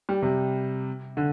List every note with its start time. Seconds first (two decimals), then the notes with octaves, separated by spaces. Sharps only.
0.09 G3
0.22 C3
1.17 D3